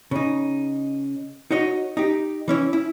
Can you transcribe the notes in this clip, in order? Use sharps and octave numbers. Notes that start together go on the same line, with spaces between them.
C#3 D#4
D#4 F#4 C#5 D#5
D#4 G4
E3 C#4 E4
E4